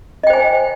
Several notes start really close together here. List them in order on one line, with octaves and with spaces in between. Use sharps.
D#5 G5 C5 G#5